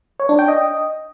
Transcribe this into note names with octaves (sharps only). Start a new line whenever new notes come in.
C#5
D4
G5
D#5